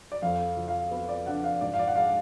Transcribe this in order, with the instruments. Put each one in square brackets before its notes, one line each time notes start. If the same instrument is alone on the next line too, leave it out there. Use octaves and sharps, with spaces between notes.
[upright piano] D5
F2 F5
F3
F5
B3
D5
D4 F#5
F5
G#2 D5
F5
D5
F#5
G#3 F5